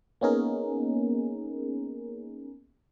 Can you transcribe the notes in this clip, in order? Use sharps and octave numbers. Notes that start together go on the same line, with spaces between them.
A#3 B3 C#4 D#4 G#4 A#4